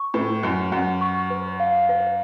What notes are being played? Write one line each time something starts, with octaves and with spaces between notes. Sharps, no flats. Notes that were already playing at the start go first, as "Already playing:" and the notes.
Already playing: C#6
A2 B4
F#2 B4
F#2 F#5
C#6
B4
F5
B4